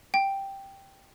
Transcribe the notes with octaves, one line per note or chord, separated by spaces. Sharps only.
G5